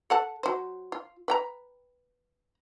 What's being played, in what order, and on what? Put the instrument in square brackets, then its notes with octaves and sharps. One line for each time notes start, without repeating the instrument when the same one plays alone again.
[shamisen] A4 F#5 A5
F#3 C5
F4
B4 G5 A#5